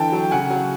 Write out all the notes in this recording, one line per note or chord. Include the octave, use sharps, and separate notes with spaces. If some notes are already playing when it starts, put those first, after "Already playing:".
Already playing: D3 E3 G5 A5
F#3
C#3 F#5 G#5
F#3